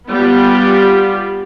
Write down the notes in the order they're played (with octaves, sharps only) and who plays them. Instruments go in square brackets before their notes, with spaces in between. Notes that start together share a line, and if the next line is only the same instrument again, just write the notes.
[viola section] G3 B3 F4 G4